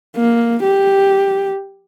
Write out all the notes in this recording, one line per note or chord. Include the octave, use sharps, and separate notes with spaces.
A#3
G4